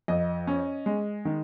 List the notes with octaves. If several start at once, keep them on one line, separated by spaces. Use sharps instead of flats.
F2 D#5
C#4
G#3
D#3